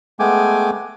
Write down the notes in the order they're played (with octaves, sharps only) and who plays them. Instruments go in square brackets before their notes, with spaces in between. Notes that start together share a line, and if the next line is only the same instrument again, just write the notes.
[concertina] G#3 A3 B3 G5 G#5 D6